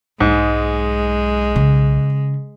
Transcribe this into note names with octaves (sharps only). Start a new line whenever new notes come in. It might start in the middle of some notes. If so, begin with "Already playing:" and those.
B1 G#2 G#3
C#3